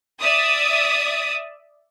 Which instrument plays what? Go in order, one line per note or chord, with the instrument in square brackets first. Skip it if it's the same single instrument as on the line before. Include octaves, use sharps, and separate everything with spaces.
[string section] D5 E5 D#6